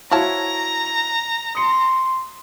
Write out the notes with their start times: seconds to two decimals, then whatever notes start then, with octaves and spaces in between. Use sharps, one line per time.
0.11 F3 E4 F#4 C#5 F5 A5 A#5
1.55 C6 D#6 C#7